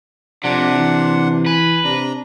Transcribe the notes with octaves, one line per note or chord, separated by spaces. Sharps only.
F2 C3 D4 F#5
E3
B4 G#5
C3 D4 A#5